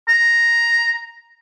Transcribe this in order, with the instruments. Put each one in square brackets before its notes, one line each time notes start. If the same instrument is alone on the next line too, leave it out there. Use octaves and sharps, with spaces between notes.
[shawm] A#5